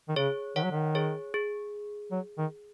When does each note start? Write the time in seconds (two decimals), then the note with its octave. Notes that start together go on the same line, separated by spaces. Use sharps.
0.08 D#3
0.16 C#3 G#4 C#5
0.56 D#3 C#5 F#5
0.64 F#3
0.71 D#3
0.95 G#4 C#5
1.34 G#4
2.12 F#3
2.38 D#3